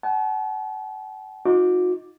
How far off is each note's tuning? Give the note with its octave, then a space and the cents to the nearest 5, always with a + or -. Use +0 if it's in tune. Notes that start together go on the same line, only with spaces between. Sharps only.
F#5 +40 A5 -45
D#4 +15 F#4 -40 D6 +0